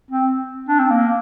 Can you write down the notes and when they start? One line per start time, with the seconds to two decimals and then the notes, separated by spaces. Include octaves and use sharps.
0.11 C4
0.69 D4
0.79 C4
0.90 A#3